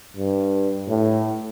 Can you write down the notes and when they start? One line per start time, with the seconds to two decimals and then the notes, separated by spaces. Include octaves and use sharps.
0.17 G2
0.88 A2